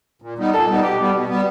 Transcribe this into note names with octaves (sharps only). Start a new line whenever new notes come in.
A#2
G3 B3 D#4
A#2 A4
G3 B3 D#4
B2 G4
G3 B3
B2
G3 B3